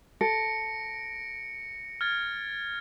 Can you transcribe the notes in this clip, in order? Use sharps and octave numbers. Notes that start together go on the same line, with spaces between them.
A4 A#6 C#7 D7
F6 G#6 A6